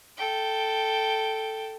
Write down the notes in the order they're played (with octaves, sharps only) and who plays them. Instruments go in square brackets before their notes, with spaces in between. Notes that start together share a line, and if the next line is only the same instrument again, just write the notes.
[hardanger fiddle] A4 G5